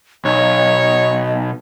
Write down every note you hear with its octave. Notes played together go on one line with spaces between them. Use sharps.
B1 C#5 D#5